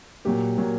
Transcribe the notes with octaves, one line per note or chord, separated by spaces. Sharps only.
A#2 F#3 A#3 G4
A#2 F#3 A#3